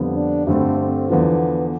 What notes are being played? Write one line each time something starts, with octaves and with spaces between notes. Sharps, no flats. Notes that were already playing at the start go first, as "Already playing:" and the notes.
Already playing: F2 D3 G3 B3
D4
G2 D3 A3 C4
C4
E2 D3 F3 B3